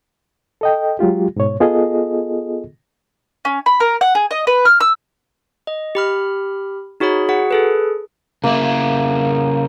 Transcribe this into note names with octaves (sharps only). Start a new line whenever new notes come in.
A4 D#5 G5
F#3 G#3 F4 G4
G#2 B2 C#5
B3 F4 G#4 A4 D#5
C#4
B5
A#4
F#5
G#4
D#5
B4
F6
E6
D#5
G4 B5 F6
D#4 F#4 G#4 C#5 B5
F#4 G#4 F#5
G#4 A4 B4
C#3 A#3 E4